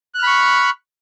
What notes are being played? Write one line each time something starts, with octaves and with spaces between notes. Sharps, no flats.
B5 C#6 F6 F#6